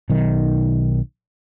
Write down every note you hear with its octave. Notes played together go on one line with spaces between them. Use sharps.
B1 D#3